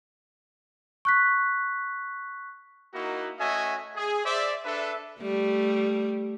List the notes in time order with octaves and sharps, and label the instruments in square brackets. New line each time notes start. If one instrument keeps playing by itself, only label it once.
[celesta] C#6 F#6 B6
[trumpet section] A#3 D#4 E4 F#4
A3 C#4 F#4 D#5 E5 G#5
G#4
C5 D5 E5
D4 A4 B4 E5
[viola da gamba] G3 A3